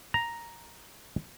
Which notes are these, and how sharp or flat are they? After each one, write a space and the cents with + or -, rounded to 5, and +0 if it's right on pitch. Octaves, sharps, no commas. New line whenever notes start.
A#5 +0